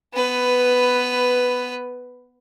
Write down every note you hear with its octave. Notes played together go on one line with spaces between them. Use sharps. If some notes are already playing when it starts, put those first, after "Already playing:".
B3 B4